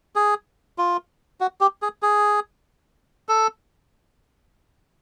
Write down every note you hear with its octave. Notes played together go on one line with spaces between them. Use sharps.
G#4
F4
F#4
G4
G#4
G#4
A4